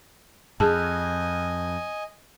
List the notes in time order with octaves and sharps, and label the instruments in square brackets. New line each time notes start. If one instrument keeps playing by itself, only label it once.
[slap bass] F2 [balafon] G#4 A5 [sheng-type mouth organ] D#5 G#5